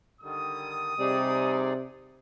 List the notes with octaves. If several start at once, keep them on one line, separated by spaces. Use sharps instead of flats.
D3 D#3 G3 D#6
C3 G3 D#4 G#4 D5